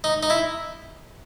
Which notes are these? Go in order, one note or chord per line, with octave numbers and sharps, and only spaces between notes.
D#4
D#4
E4